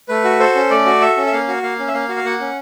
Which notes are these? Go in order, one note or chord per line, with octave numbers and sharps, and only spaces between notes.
A3 B4
F#4
A4 C5
C#4
A3 D5
F#4
A4 E5
C#4
E5
A#3 F5
F#4
A#3 F5
C#4
E5
A#3 F5
F#4
F5
A#3 F#5
C#4